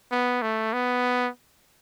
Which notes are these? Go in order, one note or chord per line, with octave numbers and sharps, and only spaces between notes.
B3
A3
B3